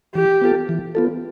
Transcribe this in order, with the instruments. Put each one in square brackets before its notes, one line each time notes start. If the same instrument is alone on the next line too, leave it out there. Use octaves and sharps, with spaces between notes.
[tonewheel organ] E3 [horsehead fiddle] G4
[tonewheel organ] B3 F4 A4
E3
B3 F4 A4